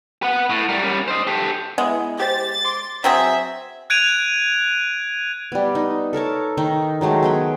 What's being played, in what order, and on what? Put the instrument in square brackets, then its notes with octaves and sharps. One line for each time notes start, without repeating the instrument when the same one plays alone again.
[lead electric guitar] B4 F#5
A2
G3 A#4
G3 C#4
C5 D#5
G4 A4
[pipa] G#3 [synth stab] B3 E4
[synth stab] G4 C5 [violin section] A6
[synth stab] C6 D6 G#6
[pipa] F#3 C4 G#4 [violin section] E5
[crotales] F#6 G#6 D7 D#7 F7
[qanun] G3 B3
D#4
A4 A#4 C#5 A5
D#3 D#4
D#3 F#3 G#3 A3
B3 G#4 G5